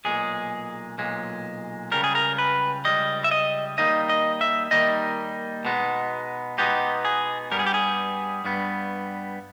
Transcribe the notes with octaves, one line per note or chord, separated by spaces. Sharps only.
B1 A#2 G#3 G#4
B1 A#2 G#3
C#2 C#3 G3 A#4
G#4
A#4
B4
C#2 C#3 G3 D#5
E5
D#5
D#2 D#3 G3 A#3 D#4 D#5
D#5
E5
D#2 D#3 G3 A#3 D#4 D#5
B2 G#3 B3 D#4
B2 G#3 B3 D#4 G4
G#4
G2 G3 B3 A#4
G#4
G4
G#4
G2 G3 B3